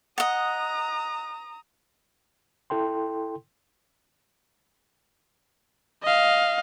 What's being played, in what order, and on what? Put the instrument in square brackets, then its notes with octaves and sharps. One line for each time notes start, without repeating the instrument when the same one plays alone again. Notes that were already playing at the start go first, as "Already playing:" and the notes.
[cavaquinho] D#5 F#5 [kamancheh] A#5 D#6
[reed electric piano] E4 A4 G5 C6
[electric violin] D#5 F5